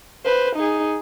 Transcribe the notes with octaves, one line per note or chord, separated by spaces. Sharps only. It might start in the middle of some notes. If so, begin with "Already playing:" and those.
B4 C5
D#4 G#4